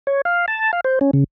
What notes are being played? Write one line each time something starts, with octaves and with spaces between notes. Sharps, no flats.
C#5
F5
A5
F5
C5
C#4
C#3